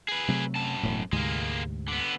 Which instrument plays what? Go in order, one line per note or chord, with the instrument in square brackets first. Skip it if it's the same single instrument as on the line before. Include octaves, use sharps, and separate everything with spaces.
[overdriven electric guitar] G#4 B4
[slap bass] C3 F#3 A3
[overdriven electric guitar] F#2 A5
[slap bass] E1 A2
[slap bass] D2 G#2 C3 [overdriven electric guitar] G#3 A#3
[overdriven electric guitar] D3 B3